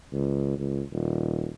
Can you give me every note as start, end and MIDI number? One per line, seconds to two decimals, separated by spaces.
0.12 0.55 37
0.59 0.82 37
0.92 1.48 27